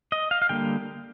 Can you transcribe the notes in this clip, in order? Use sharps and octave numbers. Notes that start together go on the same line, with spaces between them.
D#5
F5
F5
D3 G3 A#3 G5